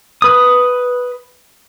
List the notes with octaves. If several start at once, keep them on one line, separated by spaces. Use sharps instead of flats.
B4 D#6